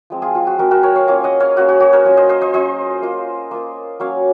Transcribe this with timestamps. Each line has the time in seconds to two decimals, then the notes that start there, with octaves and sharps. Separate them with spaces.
0.10 F3 G#3 C4
0.22 F4 G#4
0.35 F4
0.47 F#4
0.59 F3 G#3 C4 F#4 A#4
0.71 F#4 A#4
0.83 A#4 C#5
0.96 C#5 F5
1.08 A#3 C#4 F4 C#5 F5
1.24 D#5 F#5
1.40 C#5 F5
1.56 A#3 C#4 F4 F#4
1.68 F#4
1.80 F#4
1.93 A#4 C#5
2.05 F#3 C#4 F4
2.17 C5 D#5
2.29 C5 D#5
2.41 C5 D#5
2.54 F#3 C#4 F4 C5 D#5
3.02 A#3 F4
3.51 A#3 F4
4.00 F#3 A#3 C#4 C#5 F5